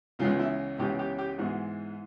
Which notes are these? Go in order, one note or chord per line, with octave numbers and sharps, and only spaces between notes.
C#2 C#3 E3 G#3 B3 F4
E4
C#2 C#3 E3 G#3 B3 G4
G4
G4
G#2 E3 G#3 B3 F#4